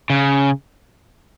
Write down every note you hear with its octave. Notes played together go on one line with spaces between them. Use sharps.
C#3